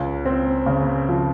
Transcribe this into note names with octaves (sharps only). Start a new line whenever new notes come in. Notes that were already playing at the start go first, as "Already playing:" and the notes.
Already playing: C#2
C4
C#3
F3